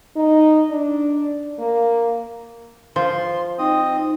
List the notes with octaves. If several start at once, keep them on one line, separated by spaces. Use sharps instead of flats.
D#4
D4
A#3
F3 C6
C4 D#4 D#5 D#6